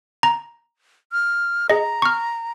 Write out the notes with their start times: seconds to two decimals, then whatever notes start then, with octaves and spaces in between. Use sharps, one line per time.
0.23 A#5
1.12 F6
1.70 G#4 D#5 A#5
2.02 C#6 F6